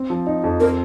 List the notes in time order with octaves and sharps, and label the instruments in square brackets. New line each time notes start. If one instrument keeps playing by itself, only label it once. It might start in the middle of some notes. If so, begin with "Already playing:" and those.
Already playing: [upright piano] C4
F3
D#4
F2
[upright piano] C4 [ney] A#4